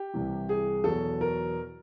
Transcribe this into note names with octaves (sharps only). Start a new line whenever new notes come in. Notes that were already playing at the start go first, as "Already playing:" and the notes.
Already playing: G4
C2 C3 E3
G#4
E2 B2 F#3 A4
A#4